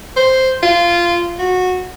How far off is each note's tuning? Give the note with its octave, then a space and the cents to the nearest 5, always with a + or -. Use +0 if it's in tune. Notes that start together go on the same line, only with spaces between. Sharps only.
C5 +0
F4 -15
F#4 -15